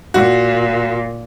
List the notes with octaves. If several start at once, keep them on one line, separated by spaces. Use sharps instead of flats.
A#2 F#4